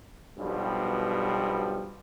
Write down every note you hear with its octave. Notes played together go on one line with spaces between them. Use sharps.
B1 G2 B2 F3 G3